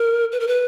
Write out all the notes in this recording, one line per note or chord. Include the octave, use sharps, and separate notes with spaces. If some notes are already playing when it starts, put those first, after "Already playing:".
Already playing: A#4
B4
A#4
B4